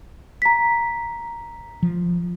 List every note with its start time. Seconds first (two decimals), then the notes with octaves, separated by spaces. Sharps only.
0.42 A#5 B6
1.83 F3